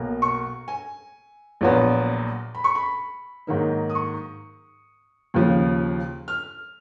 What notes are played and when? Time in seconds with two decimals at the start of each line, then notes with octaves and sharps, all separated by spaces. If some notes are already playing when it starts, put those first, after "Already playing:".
Already playing: B1 B2 A#3
0.22 C#6
0.68 G#5
1.61 A#1 A#2 F#3 B3
2.55 B5
2.64 C#6
2.75 B5
3.47 G#2 D#3 F#3 A#3 D#4
3.90 D#6
3.95 C#6
5.34 D#2 C#3 F3
6.28 F6